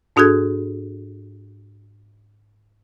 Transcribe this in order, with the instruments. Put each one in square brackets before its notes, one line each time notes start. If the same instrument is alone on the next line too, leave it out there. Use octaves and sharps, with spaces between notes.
[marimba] G#2 D4 F#4 G#4 A4 G#6